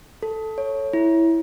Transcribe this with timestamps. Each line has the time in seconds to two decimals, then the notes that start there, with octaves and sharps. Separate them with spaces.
0.23 A4
0.58 C#5
0.93 E4